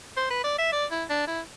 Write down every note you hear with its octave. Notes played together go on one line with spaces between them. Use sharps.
C5
B4
D5
E5
D5
E4
D4
E4